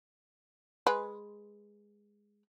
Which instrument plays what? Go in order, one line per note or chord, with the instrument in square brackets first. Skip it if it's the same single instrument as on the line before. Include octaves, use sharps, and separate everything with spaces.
[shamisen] G#3 B4